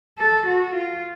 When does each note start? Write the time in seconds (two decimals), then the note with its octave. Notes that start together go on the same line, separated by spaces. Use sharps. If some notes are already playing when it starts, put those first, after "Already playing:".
0.18 A4
0.46 F#4
0.74 F4